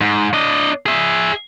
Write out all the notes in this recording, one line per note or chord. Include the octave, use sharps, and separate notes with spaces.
G#2
D4 D#5
G#4 E5